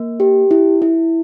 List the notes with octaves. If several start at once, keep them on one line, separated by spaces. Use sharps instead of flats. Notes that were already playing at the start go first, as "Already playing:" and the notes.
Already playing: A#3
G4
E4
E4